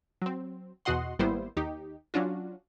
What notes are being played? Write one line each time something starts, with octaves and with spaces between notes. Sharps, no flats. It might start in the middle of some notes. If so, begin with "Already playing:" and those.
F#3 C4
E2 B2 F#4 D#5 F#5 C6
G#1 G3 A#3 B3 E4 C5
D#2 D#4 G4
F#3 C#4 D4 F4 F#4